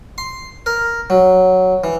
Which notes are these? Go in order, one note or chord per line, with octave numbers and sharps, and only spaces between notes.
C6
A#4
F#3
E3